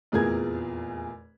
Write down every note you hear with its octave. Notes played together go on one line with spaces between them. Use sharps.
F1 E2 A#2 G#4 A#4 G#6